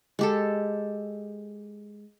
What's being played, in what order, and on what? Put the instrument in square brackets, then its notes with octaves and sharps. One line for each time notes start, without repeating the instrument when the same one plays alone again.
[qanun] G#3 G4 A4